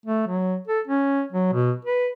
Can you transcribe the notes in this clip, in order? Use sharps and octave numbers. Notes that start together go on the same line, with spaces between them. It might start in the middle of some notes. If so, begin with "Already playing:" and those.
A3
F#3
A4
C#4
F#3
B2
B4